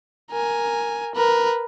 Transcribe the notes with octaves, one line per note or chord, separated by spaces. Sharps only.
A#4 G#5
A#4 B4